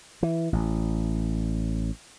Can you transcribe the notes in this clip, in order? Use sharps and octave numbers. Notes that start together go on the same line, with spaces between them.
E3
A1